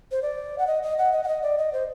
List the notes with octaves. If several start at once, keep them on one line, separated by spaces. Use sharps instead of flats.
C5
D5
F#5
D#5
D#5
F#5
D#5
F#5
D#5
D5
D#5
C5